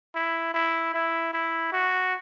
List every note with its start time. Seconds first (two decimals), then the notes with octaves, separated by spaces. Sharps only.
0.15 E4
0.54 E4
0.94 E4
1.33 E4
1.73 F#4